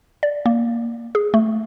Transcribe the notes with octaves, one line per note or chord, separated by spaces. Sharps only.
D5
A#3
G#4
A3